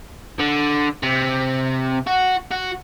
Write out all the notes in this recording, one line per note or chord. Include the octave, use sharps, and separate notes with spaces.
D3
C3
F#4
F#4